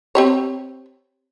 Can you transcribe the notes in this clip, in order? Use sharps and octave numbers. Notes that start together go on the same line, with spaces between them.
C4 G4 C#5